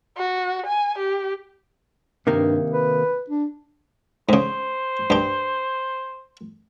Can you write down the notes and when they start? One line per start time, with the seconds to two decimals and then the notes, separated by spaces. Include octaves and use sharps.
0.17 F#4
0.66 G#5
0.98 G4
2.27 G2 C3 D#3 A#3
2.72 B4
3.30 D4
4.29 G#2 C#3 C5
5.10 G2 G4